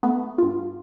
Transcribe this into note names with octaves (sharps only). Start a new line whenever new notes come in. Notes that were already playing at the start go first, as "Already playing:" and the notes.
A3 B3
G2 F4